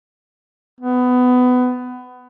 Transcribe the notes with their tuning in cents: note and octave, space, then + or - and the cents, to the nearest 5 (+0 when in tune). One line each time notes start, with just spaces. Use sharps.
B3 +20